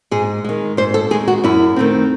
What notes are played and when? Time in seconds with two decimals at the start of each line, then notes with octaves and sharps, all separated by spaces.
0.11 G#2 G#4
0.45 D#3 G#3
0.77 G#2 C5
0.94 A4
1.11 D#3 G#3 G#4
1.28 F#4
1.44 F#2 E4
1.76 D#3 A3 C4